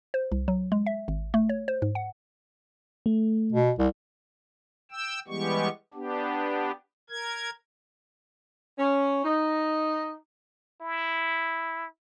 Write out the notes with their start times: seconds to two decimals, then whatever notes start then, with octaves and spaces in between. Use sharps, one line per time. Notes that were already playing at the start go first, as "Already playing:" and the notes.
0.14 C5
0.32 C2
0.48 F#3
0.72 G#3
0.86 E5
1.08 G#1
1.34 A3
1.49 C#5
1.68 C5
1.82 G#2
1.95 F#5
3.06 A3
3.53 B2
3.79 C2
4.91 G5 E6
5.28 E3 G3 G#3 B3 G4 C#6
5.94 B3 D4 G4
7.10 A#4 G#6
8.78 C#4
9.24 D#4
10.81 E4